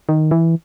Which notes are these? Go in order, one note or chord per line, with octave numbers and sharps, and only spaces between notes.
D#3
E3